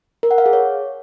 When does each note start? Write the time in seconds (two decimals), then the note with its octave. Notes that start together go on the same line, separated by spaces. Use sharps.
0.23 A#4
0.31 F#5
0.38 F5
0.46 G#4
0.53 C#5